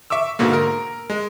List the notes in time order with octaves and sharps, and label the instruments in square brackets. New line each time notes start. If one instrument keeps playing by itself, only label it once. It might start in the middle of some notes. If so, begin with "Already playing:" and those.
[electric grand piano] E5 C#6 D6 E6
G#2 B2 D3 A#3
A#4
G#3